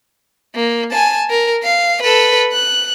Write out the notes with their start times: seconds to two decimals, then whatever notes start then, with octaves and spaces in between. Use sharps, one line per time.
0.55 A#3
0.92 G#5 A5
1.30 A#4
1.63 F5
2.03 A4 B4
2.53 F#6